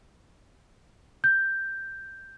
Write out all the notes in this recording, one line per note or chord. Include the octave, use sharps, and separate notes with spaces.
G6